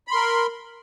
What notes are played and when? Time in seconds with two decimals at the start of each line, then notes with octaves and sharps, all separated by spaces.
0.07 B5
0.11 C6
0.15 A#4